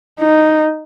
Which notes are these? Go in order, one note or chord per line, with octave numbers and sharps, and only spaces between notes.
D#4